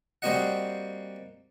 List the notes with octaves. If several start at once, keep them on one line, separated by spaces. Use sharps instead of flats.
G3 A#3 C4 F#4 D#5 F#5